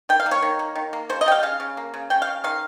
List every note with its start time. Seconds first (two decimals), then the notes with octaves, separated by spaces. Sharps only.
0.09 D#3 G5
0.20 F5
0.26 A#3
0.31 C#5
0.42 D#3
0.59 A#3
0.75 D#3
0.93 A#3
1.09 C#3 C5
1.21 D#5
1.26 G3 G5
1.32 F5
1.43 C#3 F5
1.60 C#3
1.77 A#3
1.94 C#3
2.10 C#3 G5
2.22 F5
2.27 C#3
2.44 D#3 F5